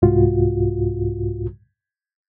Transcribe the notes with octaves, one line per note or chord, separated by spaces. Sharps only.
C2 G#2 F4 F#4